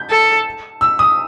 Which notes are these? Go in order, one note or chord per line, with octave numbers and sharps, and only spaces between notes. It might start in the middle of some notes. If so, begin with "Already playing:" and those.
Already playing: G6
A4
E6
D#6